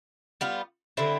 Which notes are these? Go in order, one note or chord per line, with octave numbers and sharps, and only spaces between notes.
G3 B3 F4
D3 G3 C4 E4